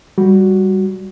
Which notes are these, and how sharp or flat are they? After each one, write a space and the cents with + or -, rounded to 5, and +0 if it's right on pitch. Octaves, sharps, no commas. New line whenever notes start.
G3 +0 F#4 +0